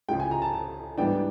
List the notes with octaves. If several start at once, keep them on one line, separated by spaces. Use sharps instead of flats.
C#2 C#3 F3 G#3 G5
G#5
A#5
A5
A5
G#2 E3 G3 B3 D4 G5